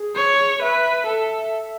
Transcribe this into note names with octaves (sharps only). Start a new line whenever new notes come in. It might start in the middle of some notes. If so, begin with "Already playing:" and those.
Already playing: G#4
C#5
B4 E5
A4